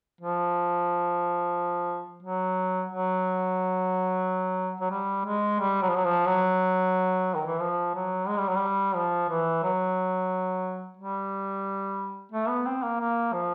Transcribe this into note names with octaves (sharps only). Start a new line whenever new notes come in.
F3
F#3
F#3
F#3
G3
G#3
G3
F#3
F3
F#3
F3
F#3
D#3
E3
F3
F#3
G#3
G3
F#3
G3
F3
E3
F#3
G3
A3
B3
C4
A#3
A#3
F3